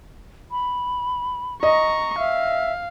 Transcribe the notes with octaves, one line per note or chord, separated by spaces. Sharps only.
B5
D#5 A#5 C#6
E5 F5